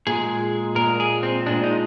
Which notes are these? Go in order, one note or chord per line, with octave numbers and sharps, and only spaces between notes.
A#2 G#3 G#4
A#2 G#3 A#4
G#4
C4
A#2 G#3 D4
D#4